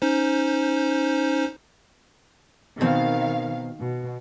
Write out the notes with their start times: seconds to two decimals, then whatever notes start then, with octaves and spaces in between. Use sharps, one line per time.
0.02 C#4 D#4 C5
2.81 B2 D#3 C4 F5
3.79 B2